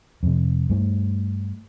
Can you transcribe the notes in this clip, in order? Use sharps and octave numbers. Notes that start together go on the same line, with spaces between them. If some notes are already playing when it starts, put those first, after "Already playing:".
F2 C3
G2 A3